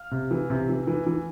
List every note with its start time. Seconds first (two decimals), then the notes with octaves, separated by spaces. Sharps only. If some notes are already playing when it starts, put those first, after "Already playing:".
Already playing: F5 F6
0.11 C3
0.31 E3
0.50 C3
0.69 E3
0.87 E3
1.07 E3